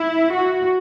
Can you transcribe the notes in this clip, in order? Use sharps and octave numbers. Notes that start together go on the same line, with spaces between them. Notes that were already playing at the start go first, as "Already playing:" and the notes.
Already playing: E4
F#4